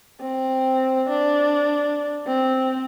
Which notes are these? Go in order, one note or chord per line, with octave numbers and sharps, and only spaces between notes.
C4
D4
C4